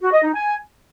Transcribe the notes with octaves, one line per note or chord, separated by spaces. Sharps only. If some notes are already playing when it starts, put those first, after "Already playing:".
F#4
D#5
D#4
G#5